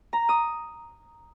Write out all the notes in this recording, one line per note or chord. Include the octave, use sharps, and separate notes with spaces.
A#5
D#6